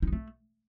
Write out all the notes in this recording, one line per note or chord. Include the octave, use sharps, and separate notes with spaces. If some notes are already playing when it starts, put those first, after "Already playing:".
D#4
G#3
A3